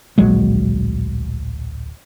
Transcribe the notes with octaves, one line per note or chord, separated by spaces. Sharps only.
D1 A#1 F#3 G#3